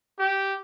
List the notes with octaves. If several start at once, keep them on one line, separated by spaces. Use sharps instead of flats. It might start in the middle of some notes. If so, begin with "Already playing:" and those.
G4